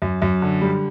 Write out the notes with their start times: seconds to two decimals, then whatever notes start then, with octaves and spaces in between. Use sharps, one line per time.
0.02 F#2
0.22 F#2
0.42 D3
0.61 G3